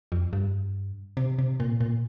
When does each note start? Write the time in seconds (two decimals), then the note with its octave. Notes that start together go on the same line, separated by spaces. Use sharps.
0.12 F2
0.33 G2
1.17 C3
1.39 C3
1.60 A#2
1.81 A#2